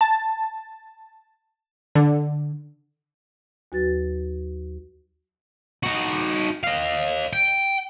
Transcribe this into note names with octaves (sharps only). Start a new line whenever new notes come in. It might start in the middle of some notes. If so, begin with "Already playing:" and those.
A5
D3
D#2 F#3 F#4 B4 A6
D#4 F#4
D#5 F5
G5